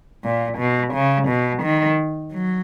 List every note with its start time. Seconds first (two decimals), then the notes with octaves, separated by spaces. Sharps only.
0.24 A#2
0.58 B2
0.93 C#3
1.28 B2
1.62 D#3
2.33 F#3